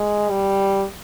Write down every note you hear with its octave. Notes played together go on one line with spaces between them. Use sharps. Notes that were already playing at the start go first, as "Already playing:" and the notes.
Already playing: G#3
G3